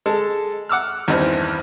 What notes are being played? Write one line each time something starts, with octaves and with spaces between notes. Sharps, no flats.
G#3 A4
F#5 D6 E6 F6
E2 G2 D#3 E3 C4